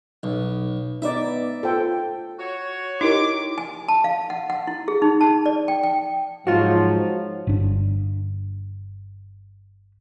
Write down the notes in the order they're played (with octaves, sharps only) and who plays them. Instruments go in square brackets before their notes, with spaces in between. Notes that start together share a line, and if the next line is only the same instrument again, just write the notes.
[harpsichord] B1
[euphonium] B3 [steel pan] D#4 B4 D5 [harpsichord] E5
[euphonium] F4 [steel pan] A4 C5 G5
[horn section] F#4 C#5
[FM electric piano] D#4 G4 A#4 [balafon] E4 [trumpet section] D6
[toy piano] G#5
A5
F5
F#5
F#5
E4
G#4
D#4
A5
D5
G5
G5
[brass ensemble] G#2 F3 F#3 [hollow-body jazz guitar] F4 F#4
[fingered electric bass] G1 D4